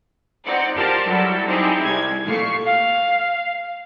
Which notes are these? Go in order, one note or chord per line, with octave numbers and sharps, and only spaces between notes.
C4 D#4 D5 F#5
F4 G4 A#4 C5 D5 A5
F#3 G3 E4 A4
C4 D#4 E4 G4 G#4
C2 G#6
A#2 A3 F5 C#6 C7
F5